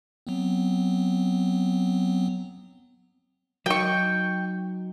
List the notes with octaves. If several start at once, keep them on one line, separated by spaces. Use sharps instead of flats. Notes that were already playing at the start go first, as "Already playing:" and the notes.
F#3 B3 C4
F#3 D#4 G5 C#6